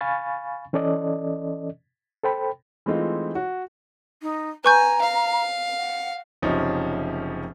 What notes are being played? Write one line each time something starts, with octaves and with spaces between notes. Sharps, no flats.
F5 G#5 B5 C#6 A6
E3 C#4 A4 D5 D#5
A4 C5 G5 B5
E3 G#3 A3 C4 D#4 F4
F#4
D#4
B4 G#5 A#5 C#6 G6
F5
F#5
F#1 C3 F3 C#4 D#4